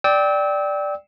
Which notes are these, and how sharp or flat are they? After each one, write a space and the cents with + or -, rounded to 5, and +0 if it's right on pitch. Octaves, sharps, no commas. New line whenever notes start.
D5 +0 G5 -5 E6 -35